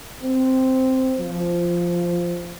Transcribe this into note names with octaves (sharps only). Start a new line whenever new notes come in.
C4
F3